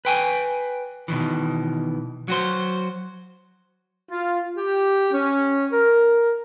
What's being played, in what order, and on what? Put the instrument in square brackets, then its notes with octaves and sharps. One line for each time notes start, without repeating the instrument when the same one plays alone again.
[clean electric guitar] B4 G5 G#5
B2 D#3 E3
F#3 F#4 C5
[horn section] F4
G4
C#4
A#4